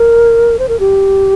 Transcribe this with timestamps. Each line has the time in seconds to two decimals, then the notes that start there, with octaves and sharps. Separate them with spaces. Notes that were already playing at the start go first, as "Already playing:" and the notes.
Already playing: A#4
0.59 C5
0.69 A#4
0.80 G4